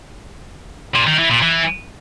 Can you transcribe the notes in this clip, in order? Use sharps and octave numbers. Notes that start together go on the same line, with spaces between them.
A#2
D#3
E3
A#2
E3